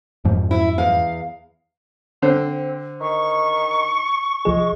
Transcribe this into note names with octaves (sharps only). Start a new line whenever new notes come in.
F2 G#2 F3
E4 E5
E2 F5
D3 C4 C5
D#3 C#6
C2 F3 G#3 G#4